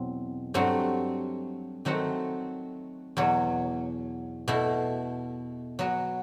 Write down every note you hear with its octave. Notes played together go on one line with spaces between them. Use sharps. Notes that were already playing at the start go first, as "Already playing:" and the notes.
Already playing: E2 B2 F#3 C4
G2 F#3 A3 C4
D#3 F#3 A3 C4 F#4
E2 B2 F#3
B2 A3 E4
F#3 B3 F#4